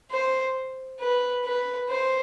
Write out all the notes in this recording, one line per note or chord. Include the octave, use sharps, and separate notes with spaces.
C5
B4
B4
C5